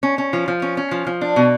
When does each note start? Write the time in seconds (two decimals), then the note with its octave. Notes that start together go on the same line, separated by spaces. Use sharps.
0.03 C#4
0.18 C#4
0.33 F3
0.48 F3
0.62 C#4
0.77 C#4
0.91 F3
1.07 F3
1.21 D4
1.36 B2